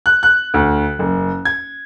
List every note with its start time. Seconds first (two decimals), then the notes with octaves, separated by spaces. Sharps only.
0.06 F#6
0.23 F#6
0.54 D2
0.99 F#1
1.45 G#6